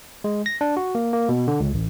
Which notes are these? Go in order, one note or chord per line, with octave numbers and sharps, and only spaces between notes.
G#3
A#6
D4
F#4
A#3
A#3
B2
D3
C#2
A1